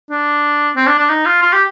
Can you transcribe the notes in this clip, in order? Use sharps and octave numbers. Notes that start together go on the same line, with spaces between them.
D4
C4
D4
D4
D#4
F4
F4
G4